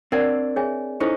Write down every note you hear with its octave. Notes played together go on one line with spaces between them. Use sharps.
C4 D4 A#4 D5 F#5
G#4 C#5 E5 G#5
C#4 D#4 E4 A4 C5